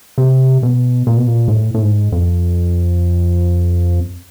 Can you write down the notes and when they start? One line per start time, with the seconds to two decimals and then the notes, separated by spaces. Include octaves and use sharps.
0.18 C3
0.63 B2
1.07 A#2
1.17 B2
1.27 A#2
1.48 G#2
1.51 A2
1.74 A2
1.82 G#2
2.12 F2